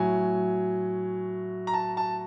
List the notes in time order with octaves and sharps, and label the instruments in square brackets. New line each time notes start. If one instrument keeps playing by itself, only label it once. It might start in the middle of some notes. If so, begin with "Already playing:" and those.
Already playing: [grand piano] A2 F#3 G#5
A#5
A5
A5